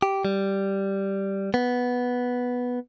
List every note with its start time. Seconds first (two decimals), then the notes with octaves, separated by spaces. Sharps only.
0.02 G4
0.25 G3
1.54 B3